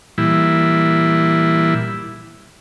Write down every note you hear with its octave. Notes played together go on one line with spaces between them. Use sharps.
A#2 E3 G3 E4